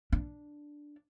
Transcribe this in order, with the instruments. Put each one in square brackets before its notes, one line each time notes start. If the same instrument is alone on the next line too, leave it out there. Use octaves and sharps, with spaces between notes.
[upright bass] D4